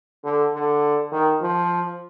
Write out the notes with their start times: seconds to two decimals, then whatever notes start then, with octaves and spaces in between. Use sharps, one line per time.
0.24 D3
0.54 D3
1.12 D#3
1.41 F3